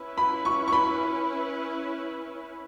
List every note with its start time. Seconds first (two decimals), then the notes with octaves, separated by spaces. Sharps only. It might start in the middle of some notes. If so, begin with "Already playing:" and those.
Already playing: C#4 E4 B4
0.18 B5
0.45 C#6
0.68 C#6
0.73 B5